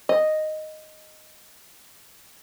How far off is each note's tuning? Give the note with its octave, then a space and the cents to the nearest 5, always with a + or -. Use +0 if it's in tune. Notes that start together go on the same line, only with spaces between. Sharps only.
D#5 -5